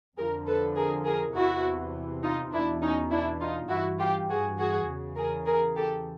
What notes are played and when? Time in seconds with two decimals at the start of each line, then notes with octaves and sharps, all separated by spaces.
0.17 F2 D3 F3 G#4 A#4
0.47 A4 B4
0.76 G#4 A#4
1.05 G#4 A#4
1.35 E2 C3 E3 E4 F#4
2.23 D#4 F4
2.52 E2 B2 D4 E4
2.82 C#4 D#4
3.11 D4 E4
3.40 D#4 F4
3.70 G2 E3 E4 F#4
3.99 F4 G4
4.29 F#4 G#4
4.58 F#4 G#4
4.88 E2 C#3 E3
5.17 G#4 A#4
5.46 G#4 A#4
5.76 G4 A4